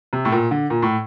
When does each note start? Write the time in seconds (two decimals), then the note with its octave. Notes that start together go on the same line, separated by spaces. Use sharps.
0.13 C3
0.25 A2
0.32 A#2
0.51 D3
0.70 A#2
0.82 A2